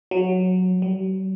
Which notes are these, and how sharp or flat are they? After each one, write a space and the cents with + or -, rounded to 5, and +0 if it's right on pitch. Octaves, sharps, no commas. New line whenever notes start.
F#3 -5
F#3 +45